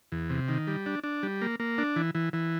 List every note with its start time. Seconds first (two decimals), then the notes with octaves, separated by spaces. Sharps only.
0.12 E2
0.30 C3
0.48 D#3
0.67 G3
0.86 D4
1.04 D4
1.23 G3
1.42 A#3
1.60 A#3
1.78 D4
1.96 E3
2.15 E3
2.33 E3